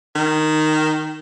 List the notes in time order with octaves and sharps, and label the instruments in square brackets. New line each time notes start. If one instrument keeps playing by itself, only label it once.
[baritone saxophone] D#3